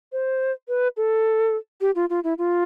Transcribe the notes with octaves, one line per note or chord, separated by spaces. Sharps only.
C5
B4
A4
G4
F4
F4
E4
F4